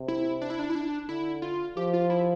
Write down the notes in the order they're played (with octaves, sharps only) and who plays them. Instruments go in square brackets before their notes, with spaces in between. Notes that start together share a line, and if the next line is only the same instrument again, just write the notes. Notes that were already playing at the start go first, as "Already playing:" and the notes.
Already playing: [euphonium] C3
[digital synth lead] E4
D4
E4
D4
E4
D4
[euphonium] D3 [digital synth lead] E4
[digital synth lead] F4
[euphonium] F3 [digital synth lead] G4
[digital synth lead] F4
E4